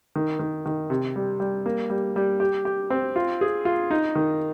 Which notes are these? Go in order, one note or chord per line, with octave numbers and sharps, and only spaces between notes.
D#3
D#3
D#3
C3
G3
G3
A#3
G3
G3
G4
G4
C4
F4
G#4
F4
D#4
D#3